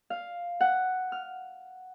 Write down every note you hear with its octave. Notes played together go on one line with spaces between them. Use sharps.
F5
F#5
F6